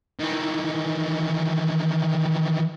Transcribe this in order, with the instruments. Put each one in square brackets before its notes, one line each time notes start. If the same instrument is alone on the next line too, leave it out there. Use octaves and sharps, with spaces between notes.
[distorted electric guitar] D#3 E3